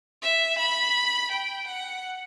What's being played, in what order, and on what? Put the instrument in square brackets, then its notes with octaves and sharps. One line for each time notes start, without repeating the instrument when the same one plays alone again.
[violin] E5
B5
G5
F#5